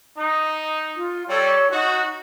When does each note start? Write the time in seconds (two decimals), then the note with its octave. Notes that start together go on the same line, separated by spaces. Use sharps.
0.17 D#4
0.96 F4
1.29 G3 A4 C#5
1.72 D#4 F#4